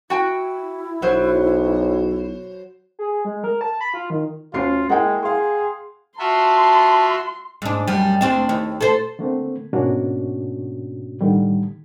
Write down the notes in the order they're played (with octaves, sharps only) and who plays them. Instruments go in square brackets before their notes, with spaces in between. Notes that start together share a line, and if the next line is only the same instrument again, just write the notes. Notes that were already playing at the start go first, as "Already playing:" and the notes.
[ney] E4 [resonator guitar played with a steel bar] F#4 G5
[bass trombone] B1 [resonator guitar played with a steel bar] F#3 C5
[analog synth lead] G#4
G#3
A#4
A5
B5
F4
D#3
[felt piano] D2 C#4 C7 [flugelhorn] F4
[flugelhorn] G#3 [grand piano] A#3 E4 [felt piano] F#5 G5
[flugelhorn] G#4 [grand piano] F5 C6
[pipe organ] F4 F#4 E5 [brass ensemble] A5 [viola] C6
[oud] G#2 D4
F#2 G3
D2 C4 D4
D#2
A4 C5
[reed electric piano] D3 A3 A#3 C4
G#2 B2 A#3 C#4 D4 F#4
A2 D3 D#3 G3